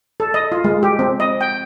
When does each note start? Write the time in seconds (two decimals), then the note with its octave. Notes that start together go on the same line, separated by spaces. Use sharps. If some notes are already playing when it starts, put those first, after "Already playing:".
0.20 A4
0.34 D#5
0.52 F4
0.64 G#3
0.83 G4
0.99 C4
1.20 D#5
1.41 G5